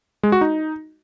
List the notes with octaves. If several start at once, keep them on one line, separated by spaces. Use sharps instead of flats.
G#3
F#4
D#4